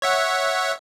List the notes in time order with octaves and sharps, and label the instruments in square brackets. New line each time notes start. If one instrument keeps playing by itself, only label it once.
[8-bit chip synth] C#5 E5 F#5